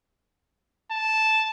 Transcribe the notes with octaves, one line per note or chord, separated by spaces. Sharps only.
A5